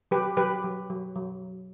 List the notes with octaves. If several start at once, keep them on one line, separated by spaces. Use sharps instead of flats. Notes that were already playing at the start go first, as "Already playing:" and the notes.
F#3 G4 B4
F#3 G4 B4
F#3
F#3
F#3